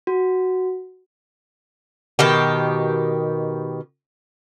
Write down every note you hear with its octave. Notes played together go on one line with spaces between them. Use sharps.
F#4
B2 D#3 G4